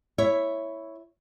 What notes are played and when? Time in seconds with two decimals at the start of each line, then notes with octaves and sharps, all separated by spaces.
0.18 E4 C#5 E5